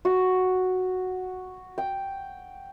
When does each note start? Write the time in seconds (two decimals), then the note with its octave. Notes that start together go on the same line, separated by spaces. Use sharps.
0.05 F#4
1.78 G5